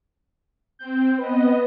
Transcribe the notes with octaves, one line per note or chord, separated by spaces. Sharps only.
C4 G6
B3 B4 D#5